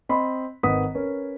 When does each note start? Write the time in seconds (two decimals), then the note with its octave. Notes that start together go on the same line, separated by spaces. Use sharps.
0.09 C4 D#5 B5 C6
0.63 G#1 D#3 B4 F#5 D#6 B6
0.95 C#4 A#4 B4